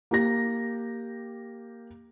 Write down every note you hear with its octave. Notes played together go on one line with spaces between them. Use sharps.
A#3 G4 A#6